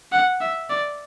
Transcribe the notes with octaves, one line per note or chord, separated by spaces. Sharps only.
F#5
E5
D5